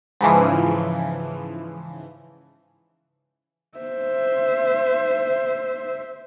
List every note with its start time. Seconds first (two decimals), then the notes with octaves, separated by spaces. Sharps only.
0.21 G#2 C#3 E3 F3
3.78 C5 E5